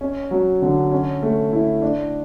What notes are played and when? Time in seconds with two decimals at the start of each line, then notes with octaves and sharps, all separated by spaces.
0.01 C#4
0.31 F#3
0.62 D3
0.91 C#4
1.22 A3
1.53 E4
1.82 D4